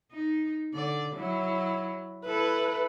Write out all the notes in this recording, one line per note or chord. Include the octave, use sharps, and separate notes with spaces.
D#4
D3 D5
F#3 E4
E4 A4 B4